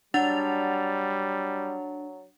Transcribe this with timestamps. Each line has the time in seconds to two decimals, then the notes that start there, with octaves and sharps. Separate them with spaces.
0.14 F#3 G3 D4 F#5 A6 F7